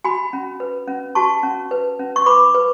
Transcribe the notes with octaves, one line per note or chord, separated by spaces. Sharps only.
F#4 G#5 B5
C#4
B4
C#4
F#4 A5 C#6
C#4
B4
C#4
C#6
B4 B5 D6
B4